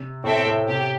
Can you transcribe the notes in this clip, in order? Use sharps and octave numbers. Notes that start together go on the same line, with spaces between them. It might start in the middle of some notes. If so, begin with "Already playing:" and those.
Already playing: C3
A2 C4 A4 E5 G5
A2
C3 G4